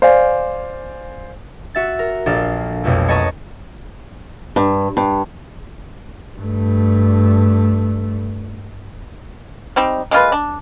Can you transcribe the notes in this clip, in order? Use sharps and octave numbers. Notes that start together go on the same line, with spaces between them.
C5 D5 F5 G#5
F#4 E5 A6
A#4
A#1 D4 A4 D5 F5
B1 F2 B2 A3
B4 C#5 D#5 A5 A#5 C#6
G2
G2
G2 A3
G3 C4 D#4
G#3 A#3 F4 B4
D4